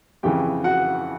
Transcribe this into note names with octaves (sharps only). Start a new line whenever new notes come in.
F2 C#3 E3 G4 G5
F#4 F#5